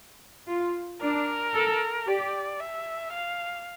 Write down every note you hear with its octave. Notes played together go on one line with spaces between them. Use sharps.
F4
D4 A#4
A4
G4 D5
E5
F5